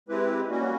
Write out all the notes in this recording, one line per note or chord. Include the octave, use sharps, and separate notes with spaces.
G#3 C4 E4 G4 B4
G3 A#3 C#4 F#4